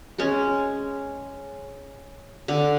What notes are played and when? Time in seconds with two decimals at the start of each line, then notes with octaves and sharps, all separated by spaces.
0.18 G#3 C#4
2.48 D3